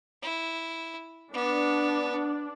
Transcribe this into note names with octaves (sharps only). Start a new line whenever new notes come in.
E4
B3 D4